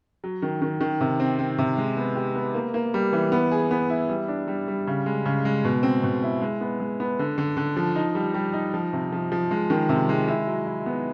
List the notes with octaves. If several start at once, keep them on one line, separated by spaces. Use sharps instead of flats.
F#3
D#3
D#3
D#3
C3
C4
C4
C3
G#3
B3
G4
B3
A#3
A#3
G3
E3
B3
G#4
B3
E4
G3
D4
G3
G3
C#3
G#3
C#3
G#3
B2
C4
B2
E4
G#3
B3
G#3
B3
D3
D3
D3
F3
D#4
G3
G3
D#4
F3
C3
F3
F3
G#3
D#3
C3
G#3
E4
F#3
E4
B3